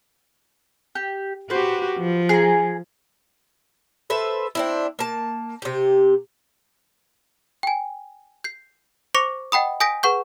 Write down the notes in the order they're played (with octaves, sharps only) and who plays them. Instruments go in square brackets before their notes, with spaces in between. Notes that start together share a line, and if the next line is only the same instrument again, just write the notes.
[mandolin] G4
[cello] F#4 G4 [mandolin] B4 C5
[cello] F3
[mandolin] G#4 A#5
[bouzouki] A4 B4 C5 E5
C4 D4 E4
A#3 A5
C3 G4
[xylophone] G5 G#5
G6 C7
C5 C#6 D6 A#6 C#7 F7
D#5 F#5 G5 B5 D#6
G#5 D#6 G6 A#6 B6 D7
G#4 B4 F#5 C#6 G6